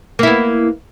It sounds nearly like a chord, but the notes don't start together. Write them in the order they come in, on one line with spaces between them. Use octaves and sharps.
A#3 E4 B3